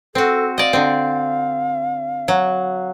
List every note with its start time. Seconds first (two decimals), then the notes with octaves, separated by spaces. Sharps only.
0.15 C4 F#4 A4
0.58 D5 D#5 F5
0.73 D3 C4
2.28 F#3